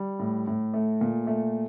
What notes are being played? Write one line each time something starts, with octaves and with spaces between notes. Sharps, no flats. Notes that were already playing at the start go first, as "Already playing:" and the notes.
Already playing: G3
A2
A2
A3
A#2
A3